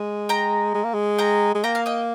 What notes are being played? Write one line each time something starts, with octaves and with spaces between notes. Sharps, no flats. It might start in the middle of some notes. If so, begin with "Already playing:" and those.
Already playing: G#3
G5 A#5
G#3
A#3
G#3
G5 A#5
G#3
A#3 G5 A#5
F5
D#5 G5